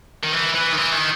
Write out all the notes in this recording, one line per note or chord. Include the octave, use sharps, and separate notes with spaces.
D#3
E3
E3
D#3
E3
D#3